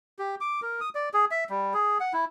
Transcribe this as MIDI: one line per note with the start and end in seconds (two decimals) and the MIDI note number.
0.19 0.35 67
0.41 0.60 86
0.62 0.80 70
0.81 0.89 87
0.95 1.09 74
1.14 1.25 68
1.31 1.44 76
1.49 1.74 55
1.74 1.98 68
2.00 2.13 78
2.13 2.25 64